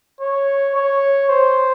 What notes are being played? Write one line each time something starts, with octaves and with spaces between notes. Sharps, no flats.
C#5
C#5
C5